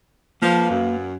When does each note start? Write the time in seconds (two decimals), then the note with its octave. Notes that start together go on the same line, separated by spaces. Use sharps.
0.42 F3 A#3 B4 F5
0.71 F#2